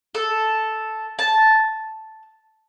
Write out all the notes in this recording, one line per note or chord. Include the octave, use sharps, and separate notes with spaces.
A4
A5